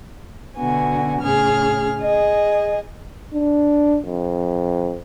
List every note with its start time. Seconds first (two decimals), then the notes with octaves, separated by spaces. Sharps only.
0.56 B2 D3 B3 F#4 G#5
1.21 A2 C#3 G#4 F6
2.01 G#4 D#5
3.33 D4
4.06 F2